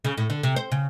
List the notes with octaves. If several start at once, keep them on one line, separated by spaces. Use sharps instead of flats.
C#3
A2
D3
C3
C5
C#3